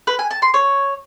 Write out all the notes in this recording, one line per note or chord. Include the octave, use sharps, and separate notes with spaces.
B4
G#5
A5
C6
C#5